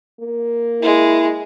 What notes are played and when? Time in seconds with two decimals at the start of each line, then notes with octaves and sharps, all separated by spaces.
0.21 A#3
0.82 G#3 E4